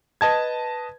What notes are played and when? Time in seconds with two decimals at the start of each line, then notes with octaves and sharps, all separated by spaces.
0.21 B4 D#5 A5 G#6